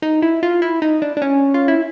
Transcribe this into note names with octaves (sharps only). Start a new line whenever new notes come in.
D#4
E4
F4
E4
D#4
D4
D4
C#4
F4
E4